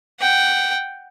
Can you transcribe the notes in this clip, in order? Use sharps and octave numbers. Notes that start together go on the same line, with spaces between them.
F#5 G5